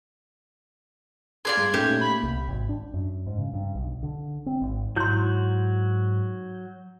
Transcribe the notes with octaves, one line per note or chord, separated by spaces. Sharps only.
F4 G#4 A#4 D5 C6 G#6
G2 G#4
A#2 A3 C#4 D#4 G4
A#3 B5
C2
G#1
D4
F#2
G#2
C#3
G2
B1
D3
C4
G#1
G#2 F#3 E4 F#4 C6 G6